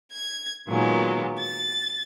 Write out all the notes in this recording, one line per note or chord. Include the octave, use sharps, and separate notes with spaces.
G#6
A#2 D#3 F#3 G#3 B3
A6